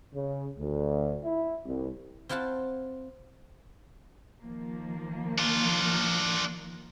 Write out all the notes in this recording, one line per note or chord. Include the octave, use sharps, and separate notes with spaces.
C#3
D2
E4
C2
C4 E4 F4 F#5 A5
D#3 F3 A#3
D4 F4